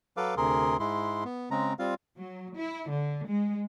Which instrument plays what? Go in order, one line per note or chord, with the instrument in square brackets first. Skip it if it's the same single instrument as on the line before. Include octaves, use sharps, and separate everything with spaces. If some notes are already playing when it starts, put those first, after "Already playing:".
[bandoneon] F#3 A4 B4 F5 D6
D2 C3 G#4 A#4 C6
G#2 G#3 E4 C6
B3
C#3 G#3 C4 A#5
G3 C4 F4 F5
[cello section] F#3
E4
D3
G#3